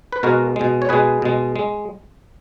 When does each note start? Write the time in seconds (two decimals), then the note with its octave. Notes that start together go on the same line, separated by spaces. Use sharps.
0.12 B4
0.23 B2 G#3 F#4 A#4
0.56 B2 G#3
0.82 C#5
0.89 B2 G#3 G#4 B4
1.22 B2 G#3
1.56 G#3